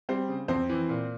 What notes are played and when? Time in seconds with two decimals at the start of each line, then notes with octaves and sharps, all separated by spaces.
0.09 G3 C4 C5
0.29 C#3
0.48 F2 C4 C5
0.69 E3
0.89 A#2